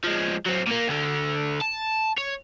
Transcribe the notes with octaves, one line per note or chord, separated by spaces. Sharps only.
F3 G#3
F#3 C4
A#2 A#3
D2 D3
A5
C#5